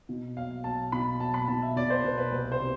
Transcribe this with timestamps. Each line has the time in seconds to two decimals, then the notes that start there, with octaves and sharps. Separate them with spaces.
0.09 B2
0.37 B1 F5
0.64 B1 A5
0.92 B2 B5
1.20 B1 A5
1.34 B5
1.48 B2 A5
1.62 E5
1.76 B2 D5
1.90 C5
2.04 B2 B4
2.18 B4
2.32 C2
2.52 C5
2.60 C3